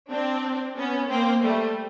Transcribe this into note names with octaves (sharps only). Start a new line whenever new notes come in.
C4 D4
B3 C#4
A#3 C4
G3 A3